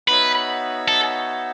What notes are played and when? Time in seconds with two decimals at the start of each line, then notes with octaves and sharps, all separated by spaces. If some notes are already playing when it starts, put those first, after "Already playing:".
0.08 B3 D#4 F#4 B4 C#5 E5
0.88 A4